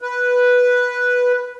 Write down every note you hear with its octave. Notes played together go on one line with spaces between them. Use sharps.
B4